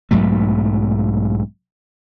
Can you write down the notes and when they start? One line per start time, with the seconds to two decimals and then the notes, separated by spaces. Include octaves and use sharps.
0.11 B1 G#2 F#3 A3